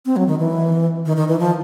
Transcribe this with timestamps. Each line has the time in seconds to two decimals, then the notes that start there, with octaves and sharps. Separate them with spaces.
0.06 C4
0.16 F#3
0.27 D#3
0.39 E3
1.06 D#3
1.17 D#3
1.28 E3
1.39 F3